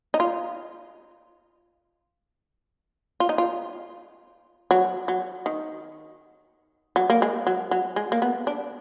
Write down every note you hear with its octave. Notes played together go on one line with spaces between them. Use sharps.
D#4
F4
F4
D#4
F4
F#3
F#3
D#3
F#3
A#3
G#3
F#3
F#3
G#3
A#3
B3
D4